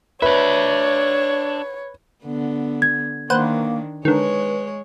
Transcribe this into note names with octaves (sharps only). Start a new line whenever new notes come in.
D4 B4 C#5 E5
D3 B3
G#6
D#3 A#3 D4 B4 C5 F#5
D3 D#3 G#3 B4 C#5